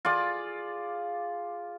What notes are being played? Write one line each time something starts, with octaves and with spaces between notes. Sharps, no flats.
F4 G#4 D5